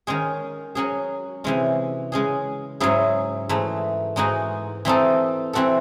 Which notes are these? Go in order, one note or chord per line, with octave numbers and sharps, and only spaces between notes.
D#3 G#3 C#4 G#4
F#3 C#4 G#4
C3 E3 G#3 C#4
C#3 G#3 C#4 G#4
G#2 F#3 C#4 E4 G#4
G#2 E3 A3
G#2 E3 G#3 D#4 F#4
E3 C4 D#4 A4
E3 C4 F#4 A4